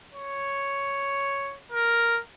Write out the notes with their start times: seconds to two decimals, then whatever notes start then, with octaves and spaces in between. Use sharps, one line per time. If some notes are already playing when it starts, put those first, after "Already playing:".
0.13 C#5
1.72 A#4